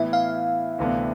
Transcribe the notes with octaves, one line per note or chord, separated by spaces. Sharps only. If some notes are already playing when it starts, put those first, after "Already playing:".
Already playing: A2 E3 B3 E5
F5
D2 C3 E3 B3 D4